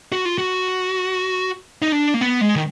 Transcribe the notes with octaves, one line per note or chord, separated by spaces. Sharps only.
F#4
F4
F#4
D#4
D4
A#3
B3
G#3
D#3